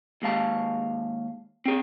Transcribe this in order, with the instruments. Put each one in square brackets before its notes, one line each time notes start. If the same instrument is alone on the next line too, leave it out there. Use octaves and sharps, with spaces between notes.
[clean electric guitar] D#2 G#3 F5 A5
C4 G#4